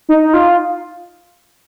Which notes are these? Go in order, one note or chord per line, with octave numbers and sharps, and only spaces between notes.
D#4
F4